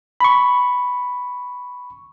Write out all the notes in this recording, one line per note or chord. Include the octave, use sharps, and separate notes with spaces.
B5 C#6